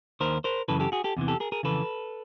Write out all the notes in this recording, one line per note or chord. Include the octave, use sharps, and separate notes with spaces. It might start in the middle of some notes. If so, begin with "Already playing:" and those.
D#2 D#3 A#4 C5
A#4 C5
F#2 C#3 E3 A4 B4
G4 A4
F#4 G#4
G4 A4
E2 C3 E3
G4 A4
G#4 A#4
G#4 A#4
F2 C#3 E3 A4 B4